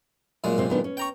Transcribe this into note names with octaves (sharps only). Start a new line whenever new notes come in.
F#2 A#2 G#3
C3 C4
D#3 B3 D4
C#4
G5 A#5 C#6